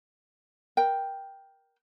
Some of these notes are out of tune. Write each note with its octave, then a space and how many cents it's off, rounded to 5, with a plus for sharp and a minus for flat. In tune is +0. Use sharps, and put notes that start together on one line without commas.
A#4 +20 G5 +0